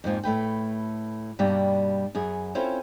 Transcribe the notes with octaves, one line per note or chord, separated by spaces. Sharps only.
F2 G#2 F3 A#3
A2 A3 B4 G5
G2 B2 G3 A#3
F#2 B3 G#4
C4 C#4 E4 F4 A4 C5